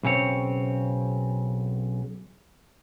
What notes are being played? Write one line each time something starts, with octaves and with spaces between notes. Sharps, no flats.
B1 C#3 C4 C#5